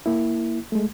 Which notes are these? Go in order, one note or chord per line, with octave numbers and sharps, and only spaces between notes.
A#3 E4
G#3 A3